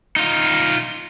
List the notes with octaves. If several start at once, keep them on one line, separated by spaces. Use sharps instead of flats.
D#4 F4